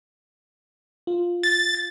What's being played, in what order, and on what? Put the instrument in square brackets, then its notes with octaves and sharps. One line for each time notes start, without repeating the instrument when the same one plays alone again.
[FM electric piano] F4
[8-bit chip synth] A6